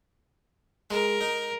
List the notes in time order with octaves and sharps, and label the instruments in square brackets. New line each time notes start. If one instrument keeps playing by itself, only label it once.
[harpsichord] G#3 [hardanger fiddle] A#4
[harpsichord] D#4